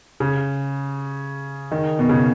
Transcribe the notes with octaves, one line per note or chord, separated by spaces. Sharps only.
C#3
D#3
B2
C#3